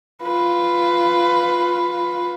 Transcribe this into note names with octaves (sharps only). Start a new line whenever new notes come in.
F4 B4